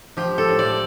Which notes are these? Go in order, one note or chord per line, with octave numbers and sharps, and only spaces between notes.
F3 G4
A4
A2
D5